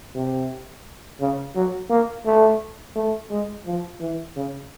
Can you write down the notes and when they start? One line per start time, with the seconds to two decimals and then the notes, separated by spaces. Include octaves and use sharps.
0.15 C3
1.20 C#3
1.55 F#3
1.90 A#3
2.26 A3
2.95 A3
3.31 G#3
3.66 F3
4.00 E3
4.36 C#3